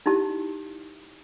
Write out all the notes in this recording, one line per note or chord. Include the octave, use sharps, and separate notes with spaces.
D#4 E4 G4 A5